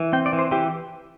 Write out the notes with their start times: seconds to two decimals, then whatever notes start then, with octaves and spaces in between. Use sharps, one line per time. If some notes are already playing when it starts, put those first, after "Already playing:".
Already playing: E3
0.13 C4 G5
0.26 D5
0.33 E3
0.39 C5
0.51 E3 G4